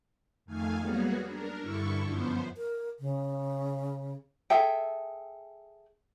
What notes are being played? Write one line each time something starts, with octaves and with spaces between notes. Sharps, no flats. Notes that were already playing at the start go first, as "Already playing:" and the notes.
F2 D#3 A3 F5 G#5
F#3 G3 A#3 B3 F#4 G#4
D4 A#4
G2 D3 E4 A4 C#6
F#2 F3 B3 C5
A#4
C#3
G#4 A4 E5 G5